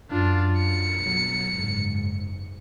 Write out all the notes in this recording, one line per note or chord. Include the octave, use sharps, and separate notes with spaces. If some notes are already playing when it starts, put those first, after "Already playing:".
F#2 D4 F4
C#7
B1 F#3
F#1 G#2